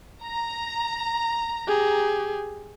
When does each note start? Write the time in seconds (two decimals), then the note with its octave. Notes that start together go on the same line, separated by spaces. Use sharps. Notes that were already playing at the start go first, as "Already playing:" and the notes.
0.23 A#5
1.67 G4 G#4